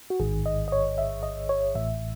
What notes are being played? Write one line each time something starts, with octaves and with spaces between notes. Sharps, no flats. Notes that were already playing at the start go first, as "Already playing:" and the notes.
F#4
A1 G#2 D#3 G#4
D#5
D#5
C#5
E5
D#5
C#5
A1 A2 E3 E5